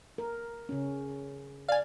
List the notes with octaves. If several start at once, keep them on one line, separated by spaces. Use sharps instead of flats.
A#4
C#3 C#4
D5 F5 G#5